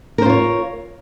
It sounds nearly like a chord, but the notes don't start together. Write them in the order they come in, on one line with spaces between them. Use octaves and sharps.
A#4 C5 F4 C#5